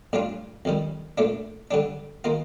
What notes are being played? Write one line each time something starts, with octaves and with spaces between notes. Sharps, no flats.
A2 G3 D4 F4
F2 D#3 G3
A#2 A3 D4
D3 G3 D4
D#3 A#3 F4